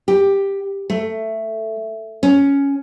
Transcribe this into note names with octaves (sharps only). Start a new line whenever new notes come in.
G4
A3
C#4